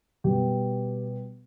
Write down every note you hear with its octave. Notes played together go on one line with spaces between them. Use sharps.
B2 G3 B3 G4